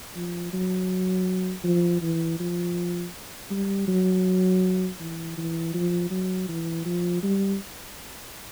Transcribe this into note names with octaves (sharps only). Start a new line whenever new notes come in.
F3
F#3
F3
E3
F3
G3
F#3
E3
E3
F3
F#3
E3
F3
G3